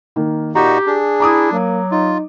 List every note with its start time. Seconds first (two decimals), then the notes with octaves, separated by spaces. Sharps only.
0.16 D#3 A#3
0.55 A#2 D#4 F#4 G4 A#5
0.87 D4 G#4
1.20 E4 A#5 D6 D#6
1.52 F#3 A#3
1.91 D#4 F4